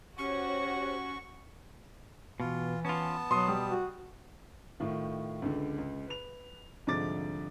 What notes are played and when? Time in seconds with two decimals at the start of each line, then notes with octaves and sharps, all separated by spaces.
0.18 C#4 F#4 G4 C5 C#5 C#6
2.40 B2 E3 F4
2.85 B3 C#4 F4 A5
3.31 B2 F#3 C6 D#6
3.48 G3
3.71 F#4
4.80 A2 D#3 F4
5.42 C#2 D3
5.78 C#2
6.08 B4 F7
6.87 C2 G#2 D3 F3 D6 A6